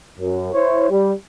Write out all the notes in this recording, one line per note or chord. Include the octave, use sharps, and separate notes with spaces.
F#2
E4 C5 C#5
G3